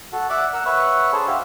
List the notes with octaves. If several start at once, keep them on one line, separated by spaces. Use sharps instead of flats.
F#4 A4
D5 E5 F#5 D6
A#4 F#5 E6
B4 C#5 E5 F#5 C#6
D4 G#4 A4 C5 C#5
F#4 G4 C5 E5 F5